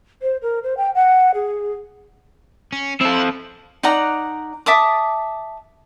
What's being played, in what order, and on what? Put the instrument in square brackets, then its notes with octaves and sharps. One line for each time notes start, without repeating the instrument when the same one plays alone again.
[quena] C5
A#4
C5
G5
F#5
G#4
[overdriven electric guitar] C#4
[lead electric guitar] C4 A4 [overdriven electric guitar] E4
[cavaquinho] D#4 D5 F#5 A#5
E5 A5 D6 D#6